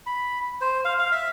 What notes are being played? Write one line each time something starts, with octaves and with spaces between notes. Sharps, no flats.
B5
C5
F5
F5
E5